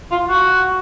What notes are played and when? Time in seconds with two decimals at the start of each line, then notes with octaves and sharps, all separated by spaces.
0.11 F4
0.29 F#4